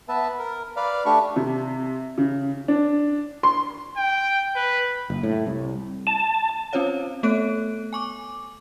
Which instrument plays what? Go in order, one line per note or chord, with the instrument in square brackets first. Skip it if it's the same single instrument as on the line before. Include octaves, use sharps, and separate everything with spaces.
[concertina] B3 B4 E5 A5
A#4
B4 D5 F5
A3 D4 G4 C#6
[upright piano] C3
C#3
D4
C6
[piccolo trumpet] G5
B4
[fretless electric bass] F#1
A2
C2
[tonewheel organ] A5
[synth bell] C4 C#4 F4 C5 C#5 F5
A3 B3 A4 C#5 F#6 D7
G#5 C#6 D6